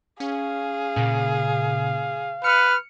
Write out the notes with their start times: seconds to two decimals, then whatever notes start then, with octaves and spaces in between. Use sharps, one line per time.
0.20 C#4 G#4 F5
0.96 A#2 C#3
2.44 B4 F6 C#7